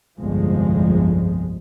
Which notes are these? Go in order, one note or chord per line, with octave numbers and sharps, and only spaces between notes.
G1 C2 F2 F3 G#3